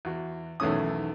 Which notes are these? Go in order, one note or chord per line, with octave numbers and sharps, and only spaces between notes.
E2 F#4
B1 E2 D#3 A3 C#4 D#6